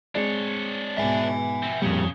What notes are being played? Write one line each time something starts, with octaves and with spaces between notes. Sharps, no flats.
G#3 C4 D4 C#5 D5
G#2 B2 E5 G#5
B2 C4
F2 A#2 C#3 G3